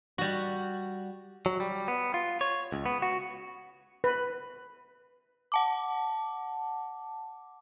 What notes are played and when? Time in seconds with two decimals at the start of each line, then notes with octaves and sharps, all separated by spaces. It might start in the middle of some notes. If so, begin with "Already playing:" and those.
0.18 G3 F#4
1.46 F#3
1.60 G3
1.88 B3
2.14 F4
2.41 C#5
2.72 C#2
2.86 B3
3.02 F#4
4.04 B4
5.52 F#5 A5 D6